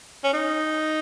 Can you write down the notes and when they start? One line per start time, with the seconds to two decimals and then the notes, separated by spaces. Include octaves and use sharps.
0.24 C#4
0.33 D#4